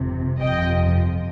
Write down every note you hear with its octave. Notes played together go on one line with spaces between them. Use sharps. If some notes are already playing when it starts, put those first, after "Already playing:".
Already playing: G1 F2 C3
G1 F2 C3 F3 D#5 G5